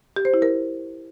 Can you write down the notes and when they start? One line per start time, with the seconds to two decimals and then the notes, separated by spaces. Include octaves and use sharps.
0.16 G4
0.25 C5
0.34 E4
0.42 A#4